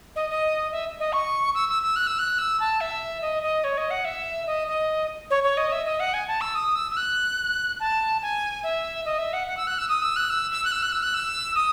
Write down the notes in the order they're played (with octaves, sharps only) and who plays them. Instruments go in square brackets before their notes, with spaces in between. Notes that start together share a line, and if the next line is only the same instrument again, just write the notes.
[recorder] D#5
D#5
E5
D#5
C#6
E6
E6
E6
F#6
E6
F#6
E6
A5
E5
D#5
D#5
C#5
D#5
F#5
E5
D#5
D#5
C#5
C#5
D#5
E5
D#5
F#5
G#5
A5
E6
D#6
E6
E6
F#6
A5
G#5
E5
D#5
E5
F#5
F#5
E6
F#6
E6
D#6
E6
F#6
E6
E6
F#6
E6
F#6
E6
F#6
E6
D#6